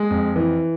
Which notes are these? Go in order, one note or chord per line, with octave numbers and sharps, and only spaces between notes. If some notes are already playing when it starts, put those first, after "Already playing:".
Already playing: G#3
F2
E3